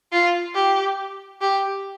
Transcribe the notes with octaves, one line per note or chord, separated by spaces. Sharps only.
F4
G4
G4